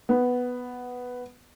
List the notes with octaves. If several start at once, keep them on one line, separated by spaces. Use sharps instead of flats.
B3